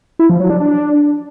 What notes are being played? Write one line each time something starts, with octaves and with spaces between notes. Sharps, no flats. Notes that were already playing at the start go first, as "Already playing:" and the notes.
E4
F3
F#3
D4
D4